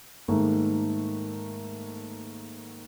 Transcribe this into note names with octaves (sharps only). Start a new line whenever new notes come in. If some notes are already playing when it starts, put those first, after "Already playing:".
G#2 D#3 A3 A#3